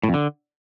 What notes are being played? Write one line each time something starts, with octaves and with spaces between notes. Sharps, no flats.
A2
F2
D3